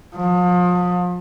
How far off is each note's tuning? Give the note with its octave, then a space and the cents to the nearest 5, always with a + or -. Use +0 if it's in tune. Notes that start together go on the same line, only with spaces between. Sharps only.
F3 +35